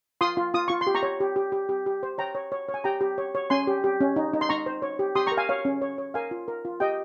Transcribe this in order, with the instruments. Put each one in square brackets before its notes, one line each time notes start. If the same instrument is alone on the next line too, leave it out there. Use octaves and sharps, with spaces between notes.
[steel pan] F4 C6 D#6
F4
F4 D#6
F4 C#6
C6
G4
A#5 C#6
C#5
G4
G4
G4
G4
G4
C5
C#5 G5 A#5
C#5
C#5
C#5
G#5
G4 G5 A#5
G4
C#5
C#5
C#4 G#5 C6
G4
G4
C#4
D#4
D#4
C6
D#4 A#5 C#6
C5
C#5
G4
G4 C6 D#6
A#5 C#6
A#4
F5 G#5
C#5 F5
C#4
C#5
C#5
A#4 F5 G#5
F4
A#4
F4
G4 D#5 G5